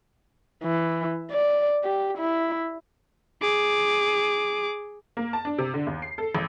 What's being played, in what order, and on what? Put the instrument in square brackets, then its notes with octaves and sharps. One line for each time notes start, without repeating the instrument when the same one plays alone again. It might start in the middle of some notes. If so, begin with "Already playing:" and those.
[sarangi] E3
D5
G4
E4
[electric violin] G#4 D6
[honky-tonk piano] A#3
A5
D4
C3
D3
D#2
C7
A4
A1